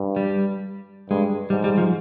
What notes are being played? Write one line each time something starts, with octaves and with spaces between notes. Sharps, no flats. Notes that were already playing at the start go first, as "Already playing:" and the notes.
Already playing: G2
G3
G2 G#3
G#2 G3
G3
F3